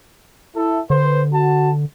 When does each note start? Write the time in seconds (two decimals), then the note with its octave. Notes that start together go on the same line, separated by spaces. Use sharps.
0.55 E4 A4
0.90 D3 B4 C5
1.33 F#4 A5